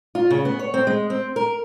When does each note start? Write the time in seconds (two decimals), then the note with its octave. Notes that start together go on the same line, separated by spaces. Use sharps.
0.15 F4
0.30 C#3
0.45 B3
0.59 C#5
0.74 C4
0.87 G#3
1.10 C4
1.36 A#4